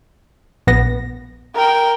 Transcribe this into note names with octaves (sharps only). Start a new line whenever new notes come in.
A#1 B3 A#6
A#4 G5